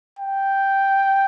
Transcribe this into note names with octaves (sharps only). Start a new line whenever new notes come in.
G5